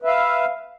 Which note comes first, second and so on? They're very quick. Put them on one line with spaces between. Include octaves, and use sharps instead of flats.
B4 E5 F5